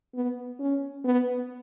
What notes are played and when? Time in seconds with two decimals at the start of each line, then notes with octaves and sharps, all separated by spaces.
0.14 B3
0.60 C#4
1.05 B3